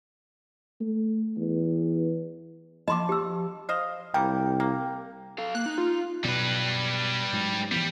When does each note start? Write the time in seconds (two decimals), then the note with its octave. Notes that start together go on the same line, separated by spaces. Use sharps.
0.81 A3
1.37 E2
2.88 F3 D#5 A5 C6 D6
3.09 G4 E6
3.69 C5 D#5 F5
4.14 C2 G3 A#3 G5
4.60 A#3
5.38 A4 F5
5.55 A#3 F#6
5.66 D#4
5.78 F4
6.24 B2 F#3 G3 B4
7.32 G#2 F#3
7.71 E3 F3 G3 B3